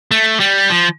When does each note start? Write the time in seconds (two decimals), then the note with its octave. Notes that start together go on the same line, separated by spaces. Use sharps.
0.11 A3
0.40 G3
0.70 F3